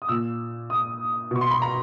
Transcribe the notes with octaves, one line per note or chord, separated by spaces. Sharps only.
D#6
A#2 E6
D#6
B2 C#6
C6
B5
A#5